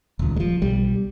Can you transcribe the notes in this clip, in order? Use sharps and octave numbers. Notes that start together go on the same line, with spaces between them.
D#1 C#2
F3 G#3
B1 G3